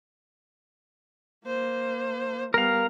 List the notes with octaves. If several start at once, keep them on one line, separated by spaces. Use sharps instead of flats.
A#3 C5
G3 B3 A#4 F5